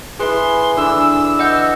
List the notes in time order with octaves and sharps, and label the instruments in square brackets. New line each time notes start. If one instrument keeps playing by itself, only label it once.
[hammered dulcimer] E4 G#5 [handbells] G#4 B4 [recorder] C6
[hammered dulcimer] D3 E3 D4 [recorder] E6
[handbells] D#5 F#5 G6